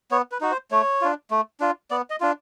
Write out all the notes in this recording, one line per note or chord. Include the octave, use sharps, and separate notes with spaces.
B3 C#5
B4
D#4 F#4
C5
A3 C#5
D4 F4
A3
D4 F4
B3 D5
D#5
D4 F4